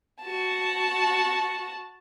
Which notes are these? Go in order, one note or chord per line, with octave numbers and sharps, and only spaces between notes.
F#4 A5